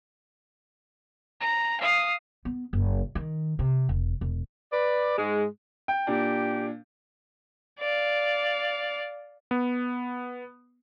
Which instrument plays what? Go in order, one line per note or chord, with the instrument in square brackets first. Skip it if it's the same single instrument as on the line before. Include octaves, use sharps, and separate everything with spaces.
[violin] A#5
F5 D#6
[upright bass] B3
F#1
D#3
C3
E1
E1
[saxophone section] B4 D5
G#2 G#3
[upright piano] G5
[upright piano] A#2 D4 [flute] G4
[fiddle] D5 F5
[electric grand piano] B3